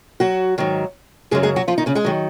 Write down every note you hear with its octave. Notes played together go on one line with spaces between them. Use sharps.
F#3 F#4
G#2 D#3 F#3
F#2 C#3 F#3 G#3 G#4
G#3 G#4
F#3 F#4
F3 F4
D#3 D#4
C#3 C#4
G#3 G#4
D#3 F#3